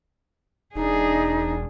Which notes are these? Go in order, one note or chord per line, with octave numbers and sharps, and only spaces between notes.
E1 D4 D#4 G#4